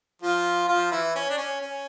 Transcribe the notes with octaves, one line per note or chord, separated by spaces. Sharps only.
F3 F4
F3 F4
E3 E4
C#4
D4
C#4
C#4